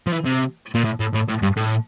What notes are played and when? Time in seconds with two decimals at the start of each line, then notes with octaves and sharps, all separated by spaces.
0.07 F3
0.12 E3
0.26 C3
0.75 A#2
0.84 A2
1.00 A2
1.14 A2
1.29 A2
1.43 G2
1.57 A2